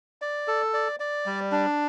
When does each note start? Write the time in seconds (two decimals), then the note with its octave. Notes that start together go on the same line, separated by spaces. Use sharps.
0.22 D5
0.48 A4
0.74 D5
1.00 D5
1.26 G3
1.52 D4